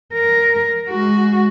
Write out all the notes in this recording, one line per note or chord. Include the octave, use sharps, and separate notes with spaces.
A#4
G#3 F#4